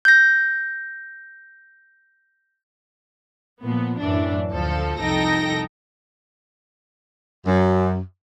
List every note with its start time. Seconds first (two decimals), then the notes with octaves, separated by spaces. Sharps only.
0.05 G6 A#6
3.62 A#2 F3 B3
4.00 F#2 A2 E3 D4
4.49 D2 F3 A4
4.99 C2 F2 D#4 A4 G5 A#6
7.46 F#2